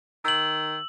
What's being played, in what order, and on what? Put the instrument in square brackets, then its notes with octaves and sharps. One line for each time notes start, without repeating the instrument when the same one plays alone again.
[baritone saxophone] D#3 [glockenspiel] E6 F#7